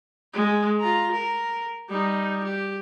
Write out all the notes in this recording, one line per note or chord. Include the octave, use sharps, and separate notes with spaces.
G#3
F4 A#5
A#4
G3 D#4
G4